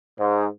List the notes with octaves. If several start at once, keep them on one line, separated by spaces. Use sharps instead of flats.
G#2